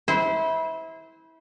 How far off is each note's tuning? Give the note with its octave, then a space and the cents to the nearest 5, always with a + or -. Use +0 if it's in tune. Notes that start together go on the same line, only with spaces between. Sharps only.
E4 -25 C5 -20